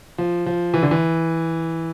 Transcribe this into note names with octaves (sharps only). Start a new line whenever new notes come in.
F3
F3
E3
D3
E3